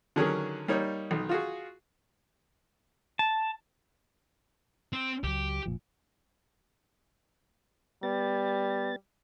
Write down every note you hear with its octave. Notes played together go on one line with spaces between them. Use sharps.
D3 D#3 F#3 C#4 G#4 A#4
G3 A#3 D#4 C#5
B1 D#3
F4 F#4 G#4
A5
C4
C#2 F#3 G4
F1 A#2 F3
G3 B3 A6